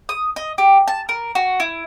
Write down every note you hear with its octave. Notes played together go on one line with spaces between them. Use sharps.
D#6
D#5
G4
A5
A#4
F#4
E4